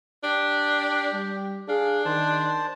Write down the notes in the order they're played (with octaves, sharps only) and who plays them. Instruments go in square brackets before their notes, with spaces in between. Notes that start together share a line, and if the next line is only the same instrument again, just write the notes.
[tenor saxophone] D4 [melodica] G4
[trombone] G3
[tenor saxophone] D4 [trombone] G#4 [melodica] F5
[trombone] D#3 [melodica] C5 A5